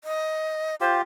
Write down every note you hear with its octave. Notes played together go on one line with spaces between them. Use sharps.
D#5
F4 G4 C5